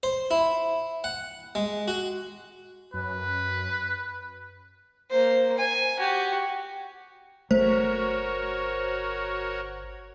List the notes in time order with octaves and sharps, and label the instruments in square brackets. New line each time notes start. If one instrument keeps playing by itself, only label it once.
[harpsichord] C5
E4
F#5
G#3
F#4
[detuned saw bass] F#2 [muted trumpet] B4
[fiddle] A#3 C5
G#5
F#4 G4
[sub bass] G1 [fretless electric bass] A3 [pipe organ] F#4 A#4 C#5 [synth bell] C5